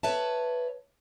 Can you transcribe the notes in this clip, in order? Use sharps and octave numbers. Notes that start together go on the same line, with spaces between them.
B4 C#5 E5 A5